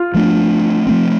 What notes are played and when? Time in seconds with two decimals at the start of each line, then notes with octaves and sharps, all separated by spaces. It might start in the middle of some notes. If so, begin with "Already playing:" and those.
Already playing: F4
0.14 F3 A3 D4
0.87 F3 A3 C4